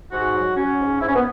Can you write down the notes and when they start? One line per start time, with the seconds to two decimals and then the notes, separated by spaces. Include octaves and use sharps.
0.12 G#2 F#4
0.35 F#3
0.56 F#3 C#4
0.79 G#2
1.01 G#2 E4
1.08 C#4
1.15 B3